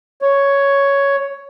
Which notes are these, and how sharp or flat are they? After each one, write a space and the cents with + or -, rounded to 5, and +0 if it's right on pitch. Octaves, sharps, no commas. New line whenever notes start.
C#5 +5